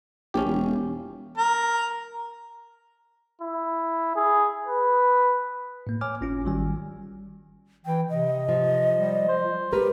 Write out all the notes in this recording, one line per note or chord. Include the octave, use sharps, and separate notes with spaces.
A#1 C#4 G4
E1
A#4
E4
G#4
B4
A2 A#3
C#5 G#5 D6 F6
G1 C#4 F4
G#1 D#3 G3 G#5
E3 G5
C3 D#5
F3
G3
C5
G4 A#4 B4